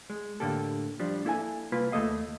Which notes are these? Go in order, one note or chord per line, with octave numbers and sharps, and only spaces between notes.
G#3
A2 D3 A#3 G4 A4
F3 G3 D4
A#3 E4 A4 D#5 G#5
C2 A#3 F4 B4
D#2 A3 A#3 A4 D#5 F5